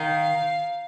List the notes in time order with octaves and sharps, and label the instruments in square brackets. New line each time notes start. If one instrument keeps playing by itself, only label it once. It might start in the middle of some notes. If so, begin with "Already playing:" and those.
Already playing: [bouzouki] D#3 [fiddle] F5